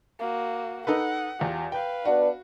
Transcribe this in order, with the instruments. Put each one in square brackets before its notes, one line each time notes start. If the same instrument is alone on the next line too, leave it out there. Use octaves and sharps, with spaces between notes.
[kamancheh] A#3 F#4
[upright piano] D#4 A4 B4 [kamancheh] F#5
[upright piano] E2 G4 [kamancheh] F4
[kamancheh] B4 F5 [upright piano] G5
[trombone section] B3 D4 [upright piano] F#4